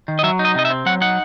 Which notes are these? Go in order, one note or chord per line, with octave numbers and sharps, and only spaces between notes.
D#3
D#5
F#3 E5
D#4
D#5
C3 D#5
E5
C4
F#3 F#5
D#4 F#5